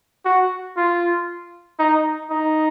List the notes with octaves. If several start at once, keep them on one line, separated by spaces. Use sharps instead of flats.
F#4
F4
D#4
D#4